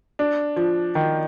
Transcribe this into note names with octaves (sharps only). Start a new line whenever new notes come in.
D4
F3
D#3